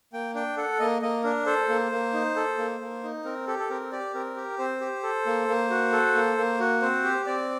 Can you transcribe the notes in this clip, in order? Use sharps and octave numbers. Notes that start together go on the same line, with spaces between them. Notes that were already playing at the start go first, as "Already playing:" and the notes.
A#3 G5
D4 G5
A4 F#5
A#3 D#5
A#3 D#5
D4 A#4
A4 C5
A#3
A#3
D#4
A4
A#3
A#3
D#4
C4 A#4
G4 A4
A4
C4 A#4
G4 D5
C4 A#4
G4
C4 C5
G4
A4
A#3
A#3
F#4
A4
A#3
A#3
F#4
C4 C5
G4
C4 D5